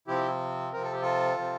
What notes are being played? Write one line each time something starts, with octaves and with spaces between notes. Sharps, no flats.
C3 F3 C4 E4 G4
C3 F3 C4 A#4
A4
G4
F4 A4
C3 F3 C4